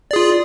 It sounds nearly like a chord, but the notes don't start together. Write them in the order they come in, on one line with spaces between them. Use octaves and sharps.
D5 G#4 F4